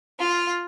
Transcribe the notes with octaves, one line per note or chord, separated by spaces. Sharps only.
F4